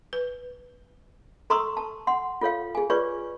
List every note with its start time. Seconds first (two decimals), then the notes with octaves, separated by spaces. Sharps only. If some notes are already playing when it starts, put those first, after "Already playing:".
0.13 B4
1.50 A4 A#5 C6 C#6 D#6 E6
1.77 A5
2.07 F#5 C6
2.41 F4 A4 C#5 F5
2.75 G#4 G#5
2.90 F4 G#4 B4 C#5 D5 C#6